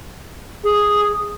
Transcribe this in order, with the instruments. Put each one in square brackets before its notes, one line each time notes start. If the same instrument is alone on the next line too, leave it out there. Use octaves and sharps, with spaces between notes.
[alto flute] G#4